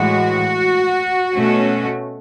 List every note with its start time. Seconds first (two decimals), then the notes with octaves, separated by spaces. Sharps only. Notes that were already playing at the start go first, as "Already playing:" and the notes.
Already playing: A2 E3 G#3 F#4
1.35 B2 A3 C#4